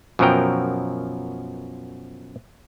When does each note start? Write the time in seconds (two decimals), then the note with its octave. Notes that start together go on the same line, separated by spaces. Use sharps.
0.19 F#2 B2 F3 F#3 A#4 G5